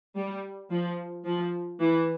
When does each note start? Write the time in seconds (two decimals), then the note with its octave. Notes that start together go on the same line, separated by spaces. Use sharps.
0.16 G3
0.70 F3
1.24 F3
1.80 E3